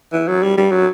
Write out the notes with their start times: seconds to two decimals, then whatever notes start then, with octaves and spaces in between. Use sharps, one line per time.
0.13 E3
0.28 F#3
0.43 G3
0.57 G3
0.72 F#3